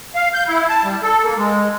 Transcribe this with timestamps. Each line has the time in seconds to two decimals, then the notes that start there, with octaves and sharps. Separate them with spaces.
0.15 F5
0.34 G6
0.48 E4
0.69 A5
0.84 G3
1.03 A4
1.24 A#3
1.37 G#3